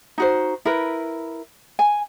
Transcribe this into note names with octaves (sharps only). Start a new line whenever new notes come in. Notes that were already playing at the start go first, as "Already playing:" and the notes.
D#4 F#4 C5
E4 A#4 B4
G#5